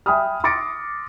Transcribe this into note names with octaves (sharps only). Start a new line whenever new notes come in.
E5 G5 G#5 B5 D#6 F6
C6 D6 A6 A#6 C#7 D7